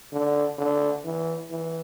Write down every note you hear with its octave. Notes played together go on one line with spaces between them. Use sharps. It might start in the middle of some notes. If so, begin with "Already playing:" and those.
D3
D3
E3
E3